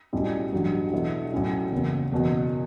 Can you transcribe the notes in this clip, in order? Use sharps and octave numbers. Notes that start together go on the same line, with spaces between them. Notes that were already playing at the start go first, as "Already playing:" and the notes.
B1 A2 G3 C#4
A1 G2 D3 F#3
E2 B2 A3 E4
A2 F#3 C#4 E4
F#1 E2 C#3
F#1 E2 B2